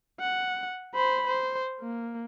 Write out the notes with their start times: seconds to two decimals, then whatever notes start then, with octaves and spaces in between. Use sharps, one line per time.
0.20 F#5
0.95 C5 B5
1.27 C5
1.81 A#3